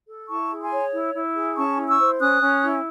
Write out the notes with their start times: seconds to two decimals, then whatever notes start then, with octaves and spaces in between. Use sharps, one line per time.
0.08 A4
0.29 E4 A5 C#6
0.51 G#4
0.61 G#5 C6
0.72 C#5
0.93 E4
1.15 E4
1.35 G#4
1.56 C#4 A5 C#6
1.78 E4
1.88 C#6 E6
1.99 C5
2.20 C#4 D#6 F#6
2.41 C#4
2.63 E4